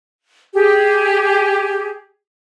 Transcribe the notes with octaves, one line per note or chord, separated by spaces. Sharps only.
G4 G#4